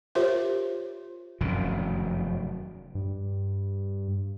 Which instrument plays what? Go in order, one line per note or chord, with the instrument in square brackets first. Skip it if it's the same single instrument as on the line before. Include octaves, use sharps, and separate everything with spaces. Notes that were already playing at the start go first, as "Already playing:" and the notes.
[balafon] F4 G4 A#4 C5 C#5 E5
[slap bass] F1 F#2 B2 D#3
[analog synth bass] G2